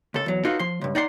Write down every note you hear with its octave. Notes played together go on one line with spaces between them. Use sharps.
C#2 A4
E2 F#3
D#4 F4 F#4 A4 B4 F5
F3 C6
C#2 G2
D#4 D5 F#5 C6